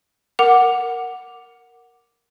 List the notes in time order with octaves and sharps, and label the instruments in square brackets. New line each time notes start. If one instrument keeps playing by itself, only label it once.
[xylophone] A#4 F#5 D6 F7